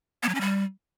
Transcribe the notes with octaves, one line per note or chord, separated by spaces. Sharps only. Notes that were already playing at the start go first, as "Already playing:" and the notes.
B3
F#3
C#4
G3